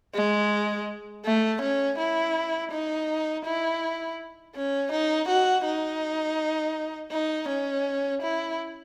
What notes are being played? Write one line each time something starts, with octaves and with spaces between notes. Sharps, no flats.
G#3
A3
C#4
E4
D#4
E4
C#4
D#4
F#4
D#4
D#4
C#4
E4